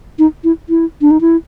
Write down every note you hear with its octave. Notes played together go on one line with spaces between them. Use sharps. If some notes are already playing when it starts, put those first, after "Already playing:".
D#4
E4
E4
D4
D#4
E4